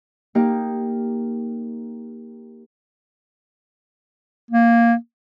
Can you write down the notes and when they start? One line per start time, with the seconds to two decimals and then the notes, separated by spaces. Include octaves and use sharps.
0.35 A#3 D#4 G4 G6
4.51 A#3